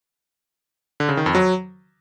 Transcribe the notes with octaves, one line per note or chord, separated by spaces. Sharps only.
D3
C#3
D#3
F2
F#3